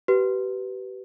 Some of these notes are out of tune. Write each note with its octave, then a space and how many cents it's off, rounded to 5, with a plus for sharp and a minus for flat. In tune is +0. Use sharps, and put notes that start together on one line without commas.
G4 -35 B4 +0